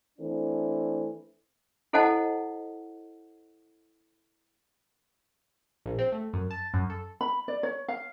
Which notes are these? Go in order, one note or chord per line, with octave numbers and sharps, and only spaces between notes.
E3 A3 C4 D4
E4 A4 C5 D#5 F#5 A5
A#1
C4
A3
F#2
A5
F#2
A4
B5
D5
C#5
F5